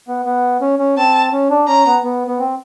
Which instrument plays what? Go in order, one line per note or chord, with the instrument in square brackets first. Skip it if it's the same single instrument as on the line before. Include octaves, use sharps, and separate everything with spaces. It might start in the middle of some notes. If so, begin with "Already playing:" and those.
[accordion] B3
B3
C#4
C#4
[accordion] C4 [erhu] A5
[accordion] C#4
D4
[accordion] C#4 [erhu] A#5
[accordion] B3
B3
B3
C4